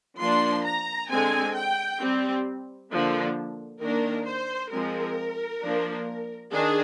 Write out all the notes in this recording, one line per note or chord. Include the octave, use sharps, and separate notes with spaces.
F3 A#3 D4 C6
A#5
D3 G#3 C4 G#5
G5
G3 C4
D3 F3 A#3 D4
D#3 A#3 D4 A#4
C5
F3 G#3 C4 A#4
F3 A#3 D4
D#3 D4 G#4